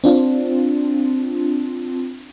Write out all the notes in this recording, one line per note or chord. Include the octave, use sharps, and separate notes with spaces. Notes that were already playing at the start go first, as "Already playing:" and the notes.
C4 D4 F4